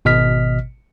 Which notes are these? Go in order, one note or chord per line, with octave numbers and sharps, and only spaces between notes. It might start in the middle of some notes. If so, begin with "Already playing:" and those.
G#1 B2 D#5 F6 B6